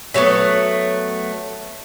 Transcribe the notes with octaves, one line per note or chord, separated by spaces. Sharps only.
D3 F#3 A3 B3